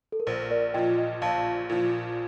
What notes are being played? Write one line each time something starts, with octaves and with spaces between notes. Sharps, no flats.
A4
A#4
A#1 C5
A#4 D5
A#2 F3 D#5 G5
D#5 G5
A#1 F5 A5
A#2 F3